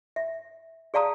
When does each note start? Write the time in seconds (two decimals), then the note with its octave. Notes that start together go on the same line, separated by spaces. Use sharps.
0.16 E5
0.94 G#4 D5 F5 A5 A#5 D#6